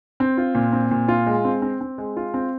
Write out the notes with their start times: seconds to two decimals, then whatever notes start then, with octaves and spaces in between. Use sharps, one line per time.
0.20 C4
0.38 F4
0.55 A#2
0.73 C4
0.91 A#2
1.08 F4
1.26 G#3
1.45 C4
1.62 C4
1.81 C4
1.98 G#3
2.17 F4
2.34 C4